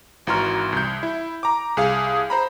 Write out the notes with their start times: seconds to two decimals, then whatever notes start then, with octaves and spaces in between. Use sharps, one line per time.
0.27 G#1 E3 F#4 A#5 C6 F6
0.72 C2 G6
1.03 E4
1.43 A#5 D6
1.77 C2 G#4 F5
2.30 C5 A#5 B5